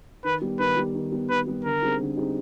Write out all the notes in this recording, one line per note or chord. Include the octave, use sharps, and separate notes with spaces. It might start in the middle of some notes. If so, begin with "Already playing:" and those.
D#3 B4
G3 B3
D#3 B4
G3 B3
D#3
G3 B3
D#3 B4
G3 B3
D3 A#4
G3 C4 D#4 G#4
D3
G3 C4 D#4 G#4